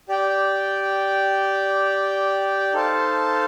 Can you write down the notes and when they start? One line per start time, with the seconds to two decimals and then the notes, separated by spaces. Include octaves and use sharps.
0.08 G4 D5 G5
2.73 D#4 A4 C5 F5 A5